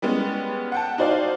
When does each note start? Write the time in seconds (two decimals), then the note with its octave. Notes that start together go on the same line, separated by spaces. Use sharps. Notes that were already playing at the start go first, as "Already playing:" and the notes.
0.02 G3 G#3 B3 C#4
0.72 F#5 G5 A5
0.98 D#4 F#4 C5 D5 F5